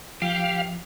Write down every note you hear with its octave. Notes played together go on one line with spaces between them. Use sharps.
F3 G4 F5